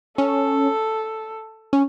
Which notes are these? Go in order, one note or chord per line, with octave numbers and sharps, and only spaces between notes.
C#4 A4
C#4